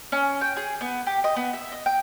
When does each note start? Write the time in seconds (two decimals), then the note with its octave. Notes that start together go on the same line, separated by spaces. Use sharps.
0.12 C#4
0.41 G5
0.56 G#4
0.81 B3
1.07 G4
1.24 D#5
1.36 B3
1.53 E5
1.72 D#5
1.86 G5